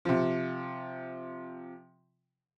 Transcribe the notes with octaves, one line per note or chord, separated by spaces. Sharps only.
C3 F3